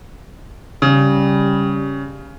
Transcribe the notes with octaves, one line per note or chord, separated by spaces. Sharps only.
C#3 G3